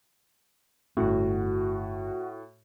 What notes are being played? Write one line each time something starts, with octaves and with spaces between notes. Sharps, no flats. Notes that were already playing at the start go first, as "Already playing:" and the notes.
G1 A2 C#4 F#4